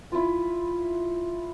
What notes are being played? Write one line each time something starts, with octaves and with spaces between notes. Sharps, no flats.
E4 F4